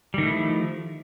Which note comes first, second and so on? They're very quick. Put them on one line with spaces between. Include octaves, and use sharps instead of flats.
G3 D#3 A3 E4 F3